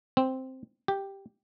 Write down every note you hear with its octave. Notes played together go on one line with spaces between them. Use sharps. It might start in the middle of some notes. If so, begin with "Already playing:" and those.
C4
G4